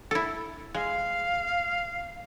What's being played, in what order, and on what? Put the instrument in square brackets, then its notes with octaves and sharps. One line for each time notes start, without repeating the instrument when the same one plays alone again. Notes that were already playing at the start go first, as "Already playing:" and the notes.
[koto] E4 A4
[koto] G#3 [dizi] F5